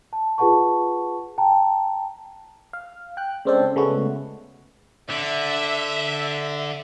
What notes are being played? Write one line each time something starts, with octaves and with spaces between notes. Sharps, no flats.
A5
F4 G#4 B4 F#5 A5 C#6
G5 A5 A#5
F5
G5 F#6
C#3 G#3 C4 D4 A4 C5
C#3 G#3 A3 B3 F#4
D3 E5